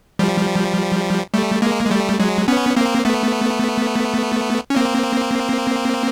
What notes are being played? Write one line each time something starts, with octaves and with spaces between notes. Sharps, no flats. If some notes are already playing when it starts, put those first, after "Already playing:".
F3 G3
G3 A3
G#3 A#3
G#3
G3 A3
F#3 G#3
B3 C#4
A#3 C4
A3 B3
C#4
A#3 C4